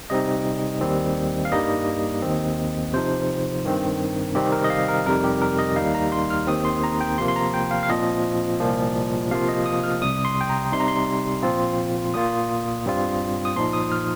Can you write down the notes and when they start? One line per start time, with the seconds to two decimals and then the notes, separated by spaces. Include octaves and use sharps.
0.10 C3 G3 C4 D#4 D#5
0.81 D#2 D#3 G3 C4
1.45 F5
1.51 G2 G3 A#3 D#4 D#5
2.22 D#2 D#3 C4
2.93 C3 F3 D#4 C5
3.65 G2 D#3 C4
4.35 C3 D#3 G3 C4 D#4 G4
4.52 A#4
4.64 D#5
4.70 F5
4.88 A#4
5.06 F2 C3 G3 D#4 A#4
5.24 G4
5.42 A#4
5.59 D#5
5.76 D#2 D#3 G3 D#4 F5
5.95 A#5
6.12 C6
6.30 F6
6.47 D#2 D#3 C4 D#6
6.65 C6
6.84 A#5
7.01 G5
7.18 C3 F3 A#3 C6
7.28 C6
7.36 A#5
7.54 G5
7.71 F5
7.83 F5
7.89 A#2 F3 C4 F4 D#5
8.60 C2 A#2 F3 A#3
9.31 C3 F3 A#3 F4 F5
9.48 D#5
9.66 D#6
9.84 F6
10.02 C2 C3 G3 D#6
10.25 C6
10.41 G5
10.49 A#5
10.72 C3 G3 D#4 C6
10.80 A#5
10.88 C6
11.43 A#2 F3 C4 F4
12.14 A#2 A#3 F4 D#6
12.86 G2 G3 C4 F4
13.45 D#6
13.56 A#2 F3 D#4 C6
13.73 D#6
13.92 F6